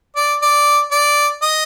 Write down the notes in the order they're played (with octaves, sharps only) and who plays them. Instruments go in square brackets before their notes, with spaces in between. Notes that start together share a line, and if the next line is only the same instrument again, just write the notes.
[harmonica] D5
D5
D5
D#5